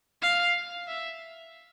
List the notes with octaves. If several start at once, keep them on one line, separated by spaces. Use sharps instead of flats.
F5
E5